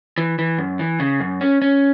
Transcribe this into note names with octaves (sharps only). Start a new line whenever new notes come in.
E3
E3
F#2
E3
C#3
F#2
C#4
C#4